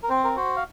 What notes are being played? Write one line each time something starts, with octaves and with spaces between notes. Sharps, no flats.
A#4
C4 C5
A#4
F#4 C5
F5